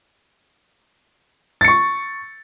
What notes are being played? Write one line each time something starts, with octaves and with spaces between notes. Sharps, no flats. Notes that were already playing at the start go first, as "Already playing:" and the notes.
C#6 A6 C#7